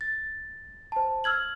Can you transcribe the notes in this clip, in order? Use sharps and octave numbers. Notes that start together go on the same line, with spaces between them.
A6
C5 A5
E6 F6 G#6 F#7